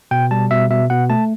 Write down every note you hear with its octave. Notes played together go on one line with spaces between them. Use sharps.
B2 G5
G3 A5
B2 E5
B2 E5
B2 F#5
A3 A5